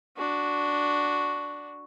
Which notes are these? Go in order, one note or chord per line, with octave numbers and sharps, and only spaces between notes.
D4 F#4